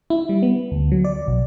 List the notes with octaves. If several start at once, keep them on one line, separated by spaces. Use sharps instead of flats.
E4
G3
B3
D2
F#3
D5
B1